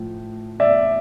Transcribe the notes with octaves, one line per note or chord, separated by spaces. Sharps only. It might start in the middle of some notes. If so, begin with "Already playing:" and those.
Already playing: A2 F3
D5 E5